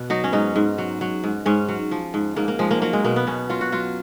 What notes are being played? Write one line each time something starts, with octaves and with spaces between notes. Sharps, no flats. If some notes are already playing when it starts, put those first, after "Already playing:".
Already playing: B2 B3
F#3 D#4
C#4
G#2 D#4
G#2
F#3
F#3
G#2
G#2 C#4
F#3
F3
G#2
G#2 A#3
A#3
F3 G#3
A#3
F#3 A#3
G#3
B2 A#3
B3
B2 C#4
F#3 F4
F#4
F#3 F4